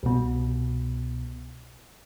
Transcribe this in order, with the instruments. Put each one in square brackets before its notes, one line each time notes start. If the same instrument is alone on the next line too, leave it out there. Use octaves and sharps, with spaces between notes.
[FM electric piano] C2 B2